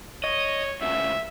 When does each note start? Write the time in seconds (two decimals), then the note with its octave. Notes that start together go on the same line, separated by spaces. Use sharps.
0.24 C#5 D#5
0.81 D2 C#3 E5